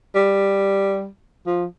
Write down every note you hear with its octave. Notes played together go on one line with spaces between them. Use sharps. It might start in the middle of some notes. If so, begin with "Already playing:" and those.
G3
F3